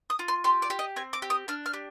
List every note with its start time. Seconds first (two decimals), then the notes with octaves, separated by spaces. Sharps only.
0.10 D#6
0.19 F4
0.28 C6
0.44 G4 C6
0.62 D5
0.70 G4
0.79 D#5
0.96 C4 G#5
1.13 D6
1.22 G4
1.30 D#6
1.48 D4 F6
1.66 F6
1.73 G4